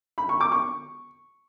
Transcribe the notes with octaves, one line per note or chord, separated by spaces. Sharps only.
B5
C#6
D6
C#6